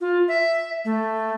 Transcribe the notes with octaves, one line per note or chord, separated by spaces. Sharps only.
F4
E5
A3